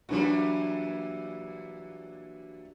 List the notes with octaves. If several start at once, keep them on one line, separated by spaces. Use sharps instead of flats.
A#2 E3 F#3 G3 D4 F#4